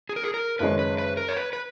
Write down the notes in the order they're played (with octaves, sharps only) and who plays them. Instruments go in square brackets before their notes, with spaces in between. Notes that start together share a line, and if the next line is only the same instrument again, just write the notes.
[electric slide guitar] G#4
A#4
G#4
A#4
[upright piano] F#1 F#2 D#3 G#3 C#4 [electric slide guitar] B4
[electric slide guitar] B4
B4
A#4
C#5
B4
B4